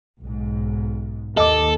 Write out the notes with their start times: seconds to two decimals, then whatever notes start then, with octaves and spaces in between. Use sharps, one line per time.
0.21 B1 G#2
1.37 D#2 A4 D#5 D6